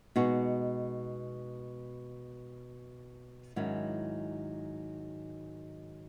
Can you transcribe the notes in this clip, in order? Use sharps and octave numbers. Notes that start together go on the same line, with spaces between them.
B2 G#3 D#4 F#4
G#2 D#3 F#3 C#4 E4